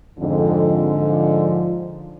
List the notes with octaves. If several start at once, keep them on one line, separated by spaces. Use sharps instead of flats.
F2 G#2 D3
F3